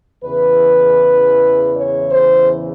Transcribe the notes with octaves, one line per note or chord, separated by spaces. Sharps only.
E2 C#3 E3 B4
C#5
C5